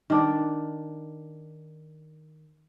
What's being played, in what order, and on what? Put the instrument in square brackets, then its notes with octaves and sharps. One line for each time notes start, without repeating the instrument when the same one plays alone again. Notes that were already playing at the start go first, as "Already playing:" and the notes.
[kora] D#3 D4 D5